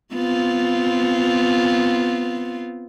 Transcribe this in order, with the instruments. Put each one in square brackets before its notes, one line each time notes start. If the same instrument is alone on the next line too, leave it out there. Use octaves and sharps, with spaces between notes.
[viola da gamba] B3 C4 F4